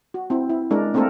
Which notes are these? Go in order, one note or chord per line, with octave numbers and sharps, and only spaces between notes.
F#4
C4 E4
E4
G#3 D4 E4 A#4
A3 A#3 C4 D4 A4 A#4